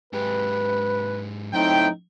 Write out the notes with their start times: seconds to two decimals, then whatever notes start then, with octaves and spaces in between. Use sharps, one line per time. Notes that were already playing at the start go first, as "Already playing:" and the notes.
0.13 G#2 G4 B4
1.53 F#2 A2 C4 D#4 E4 G5